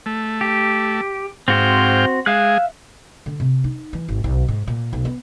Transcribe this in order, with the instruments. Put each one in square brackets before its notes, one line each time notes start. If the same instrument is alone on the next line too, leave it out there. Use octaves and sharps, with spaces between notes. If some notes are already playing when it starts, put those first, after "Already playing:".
[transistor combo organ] A3
[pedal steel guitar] G4
[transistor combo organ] G#2 F5 G5 [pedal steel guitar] C4 F#4 C5
[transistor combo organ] G#3 G#4 [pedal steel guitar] E5 F5 F#6
[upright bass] D3
C3
D#4
E3
G#1
B1
G#2
A#2
B1
B3